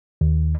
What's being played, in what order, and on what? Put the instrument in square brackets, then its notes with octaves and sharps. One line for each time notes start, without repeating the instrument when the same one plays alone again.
[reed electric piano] D#2